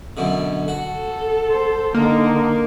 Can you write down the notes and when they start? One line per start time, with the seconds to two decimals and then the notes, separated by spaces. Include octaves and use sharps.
0.17 F#2 B2 D3
0.68 F#4 A4
1.51 C5
1.94 D3 A#3 D#4